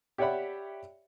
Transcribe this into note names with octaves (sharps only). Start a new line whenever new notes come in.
G4 C#5 D5 E5 F#5 B5